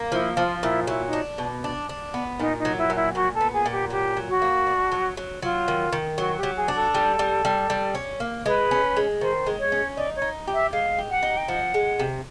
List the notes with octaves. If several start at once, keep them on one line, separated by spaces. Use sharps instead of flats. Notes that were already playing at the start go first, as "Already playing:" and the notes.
Already playing: A#3
F3 E4
F3 F4
A#2 E4
F#3 E4
D#4
D4
B2
D4
D4
B3
A#2 D#4
D#4
F#3
E4
A#2
E4
A#2 F#4
A4
B3
G#4
A#2
G4
F#3 G4
F#3
F#4
A#3
D4
F#3
F#3
F#3 F4
D#3
D#3
F#3 F#4
G4
F#3
G#4
D4
A4
G3
G3
G3
G3
C#4
A#3
G#3 B4
C#4
G#3
D#3 C5
G#3
C#5
C#4
D#4 D5
C#5
D#4
G4
E5
G#3 F5
G4
F#5
D#4
G5
F3 F#5
G#3
C3